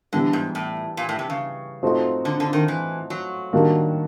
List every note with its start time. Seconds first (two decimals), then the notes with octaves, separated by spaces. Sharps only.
0.13 D3 E3 G3 B3
0.33 G#2
0.55 A2
0.97 A#2
1.09 A2
1.19 C3
1.30 C#3
1.83 F3 A3 C4 D#4 F#4
2.25 D3
2.40 D3
2.53 D#3
2.68 E3
3.10 F#3
3.53 D#3 G3 A#3 D4 F#4